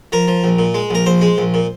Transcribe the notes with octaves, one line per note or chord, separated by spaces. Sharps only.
F3 A#4
F3
A#1
A#2
G#3
A#1 A#4
A#1 C5
G#3
A#1
A#2